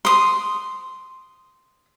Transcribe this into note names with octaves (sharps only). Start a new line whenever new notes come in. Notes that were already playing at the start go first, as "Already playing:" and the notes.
C6 D#6